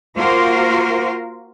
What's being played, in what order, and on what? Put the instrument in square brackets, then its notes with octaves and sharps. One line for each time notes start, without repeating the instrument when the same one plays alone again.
[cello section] A#3 F4 F#4 A#4 C5